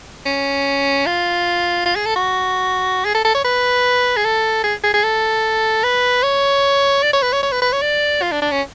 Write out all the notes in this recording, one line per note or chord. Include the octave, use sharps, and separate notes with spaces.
C#4
F4
F4
G#4
A4
F#4
G#4
A4
A4
C#5
B4
G#4
A4
G#4
G#4
G#4
A4
B4
C#5
D5
C#5
B4
C#5
C#5
B4
B4
C#5
D5
F4
D4
D4
C#4